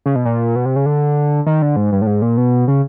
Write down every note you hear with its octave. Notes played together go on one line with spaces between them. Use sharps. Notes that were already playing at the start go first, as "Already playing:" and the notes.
C#3
B2
A#2
B2
C3
C#3
D3
D#3
D3
G#2
G2
A2
G#2
A#2
B2
C#3